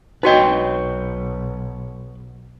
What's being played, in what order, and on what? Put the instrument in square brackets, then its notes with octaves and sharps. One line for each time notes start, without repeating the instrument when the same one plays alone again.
[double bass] B1 [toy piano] D#4 F#4 D#5 [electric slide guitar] B4 C#5 G5